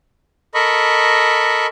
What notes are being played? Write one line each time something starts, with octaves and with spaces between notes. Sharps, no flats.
A4 A#4 D#5 B5 C#6